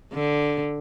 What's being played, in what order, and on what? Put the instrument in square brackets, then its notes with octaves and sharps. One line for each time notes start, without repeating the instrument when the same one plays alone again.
[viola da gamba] D3